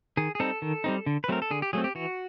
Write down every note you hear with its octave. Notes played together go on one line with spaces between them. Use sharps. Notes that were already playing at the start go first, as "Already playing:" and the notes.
D#3 G#4
G#4
G3 C4 D#4 A4
D#3
G3 C4 D#4
D3
B4
F#3 A3 C4 A#4
A4
D3 G#4
G4
F#3 A3 C4 G#4
G4
E3 F#4